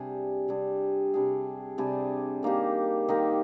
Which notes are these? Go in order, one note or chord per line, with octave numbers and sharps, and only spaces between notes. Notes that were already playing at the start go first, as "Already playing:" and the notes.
Already playing: C3 G3 D4 G#4
C3 G3 D4 G#4
C3 G3 D4 G#4
C3 G3 D4 G#4
D#3 A#3 D#4 G4
D#3 A#3 D#4 G4